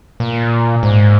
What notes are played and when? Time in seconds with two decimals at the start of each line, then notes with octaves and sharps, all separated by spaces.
0.20 A#2
0.83 G#2